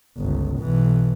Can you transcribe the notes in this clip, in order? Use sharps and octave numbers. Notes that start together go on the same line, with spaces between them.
G1 C#2
B1 E3